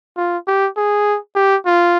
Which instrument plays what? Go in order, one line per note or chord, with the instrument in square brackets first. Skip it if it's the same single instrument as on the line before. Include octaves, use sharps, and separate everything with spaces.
[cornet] F4
G4
G#4
G4
F4